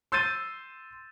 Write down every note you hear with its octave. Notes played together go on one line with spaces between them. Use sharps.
C6 E6 G6 A6 D#7